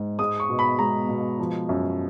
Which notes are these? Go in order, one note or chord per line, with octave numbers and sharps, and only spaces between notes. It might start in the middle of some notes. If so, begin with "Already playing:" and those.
Already playing: G#2
G#3 D#6
C#6
B2
B5
G#3 A#5
B2
F3
F#2